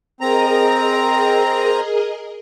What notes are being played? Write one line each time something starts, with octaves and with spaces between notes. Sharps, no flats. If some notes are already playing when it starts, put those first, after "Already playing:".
C4 G#4 A#4 D#5 A#5